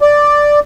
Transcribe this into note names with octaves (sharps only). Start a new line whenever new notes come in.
D5